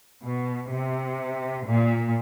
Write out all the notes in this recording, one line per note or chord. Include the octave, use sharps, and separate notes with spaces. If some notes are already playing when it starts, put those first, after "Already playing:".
B2
C3
A#2